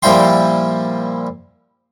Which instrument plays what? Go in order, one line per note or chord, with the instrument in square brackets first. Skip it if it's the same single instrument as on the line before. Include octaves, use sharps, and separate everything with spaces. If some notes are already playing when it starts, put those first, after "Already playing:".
[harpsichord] A#2 F3 G3 E4 G5 C6